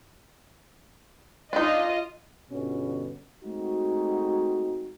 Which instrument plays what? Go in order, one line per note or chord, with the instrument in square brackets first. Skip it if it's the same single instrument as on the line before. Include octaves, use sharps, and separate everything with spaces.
[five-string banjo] D4 D#4 [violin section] F4 D#5
[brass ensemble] G1 B2 B3 C#4
G#3 A3 C4 D#4 F#4